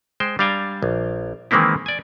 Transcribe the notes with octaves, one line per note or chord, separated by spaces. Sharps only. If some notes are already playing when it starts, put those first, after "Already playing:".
G#3 C5 G5
G3 D4 F5 G5 G#5 A#5
A#1
D#3 E3 G#3 A#3 C4 E4
D5 G#5